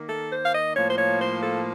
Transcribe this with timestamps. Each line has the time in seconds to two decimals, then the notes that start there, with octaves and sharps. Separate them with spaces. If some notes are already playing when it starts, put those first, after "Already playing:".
Already playing: D#3 A#3
0.08 A4
0.31 C5
0.45 F5
0.53 D#5
0.75 A2 F3 A#3 C#5
0.90 C5
0.98 C#5
1.20 C5
1.42 A4